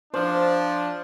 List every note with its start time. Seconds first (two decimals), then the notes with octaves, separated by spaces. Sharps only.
0.14 F3 D4 C5